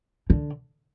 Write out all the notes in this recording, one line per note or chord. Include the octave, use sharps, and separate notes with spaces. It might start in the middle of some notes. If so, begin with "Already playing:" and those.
D3